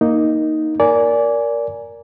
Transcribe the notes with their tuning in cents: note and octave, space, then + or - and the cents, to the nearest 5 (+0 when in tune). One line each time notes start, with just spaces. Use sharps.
A#3 +0 D#4 +0
A#4 +0 D5 -20 G#5 +5